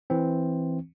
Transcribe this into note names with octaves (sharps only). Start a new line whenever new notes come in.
E3 C4